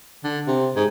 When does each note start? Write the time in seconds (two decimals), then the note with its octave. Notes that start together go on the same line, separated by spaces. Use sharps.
0.24 D3
0.47 C3
0.76 G#2